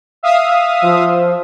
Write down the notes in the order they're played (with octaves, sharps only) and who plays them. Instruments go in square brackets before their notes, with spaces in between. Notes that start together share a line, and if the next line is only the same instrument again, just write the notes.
[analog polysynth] E5 F5 D#6
[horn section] F3